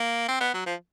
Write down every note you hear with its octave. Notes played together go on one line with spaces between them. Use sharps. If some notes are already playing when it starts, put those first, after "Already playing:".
Already playing: A#3
C4
B3
F#3
F3